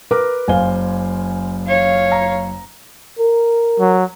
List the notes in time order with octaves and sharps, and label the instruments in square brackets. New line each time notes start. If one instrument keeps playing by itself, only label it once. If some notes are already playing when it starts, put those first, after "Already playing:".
[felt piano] A#4 B4 D6
[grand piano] F#1 C5 G7 [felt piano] F5 G#5
[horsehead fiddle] C#5 F5
[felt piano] A#5
[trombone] A#4
[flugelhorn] F#3